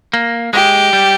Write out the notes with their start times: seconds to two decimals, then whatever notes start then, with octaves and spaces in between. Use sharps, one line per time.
0.13 A#3
0.53 G#3 G4
0.93 G3